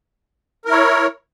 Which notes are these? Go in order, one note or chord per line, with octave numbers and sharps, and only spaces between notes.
E4 A#4 C#5